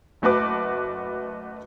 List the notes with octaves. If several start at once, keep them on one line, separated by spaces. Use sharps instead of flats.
F#1 A3 F#4 B4 D6